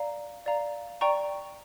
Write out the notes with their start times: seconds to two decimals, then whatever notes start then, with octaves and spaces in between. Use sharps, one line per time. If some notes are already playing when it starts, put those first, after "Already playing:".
Already playing: D5 F5 A#5
0.46 D5 F5 A#5
1.01 D5 G5 A#5 C#6